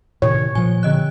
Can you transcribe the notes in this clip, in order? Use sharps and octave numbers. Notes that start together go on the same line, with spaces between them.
A2 C3 D#3 C#5
A#2 F3 G#5
D3 D#5 F#6